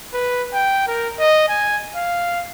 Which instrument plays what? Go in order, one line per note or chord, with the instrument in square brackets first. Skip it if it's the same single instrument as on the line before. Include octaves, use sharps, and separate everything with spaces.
[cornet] B4
G5
A#4
D#5
G#5
F5